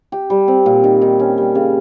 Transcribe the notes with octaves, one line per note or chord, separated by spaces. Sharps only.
G4
G3
C4
A#2
D#3
D#3
C#4
G3
C#3